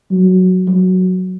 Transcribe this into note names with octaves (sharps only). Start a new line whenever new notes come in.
F#3
F#3